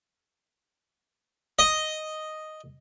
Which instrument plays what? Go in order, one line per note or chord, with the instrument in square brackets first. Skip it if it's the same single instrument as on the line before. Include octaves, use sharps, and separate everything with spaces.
[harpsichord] D#5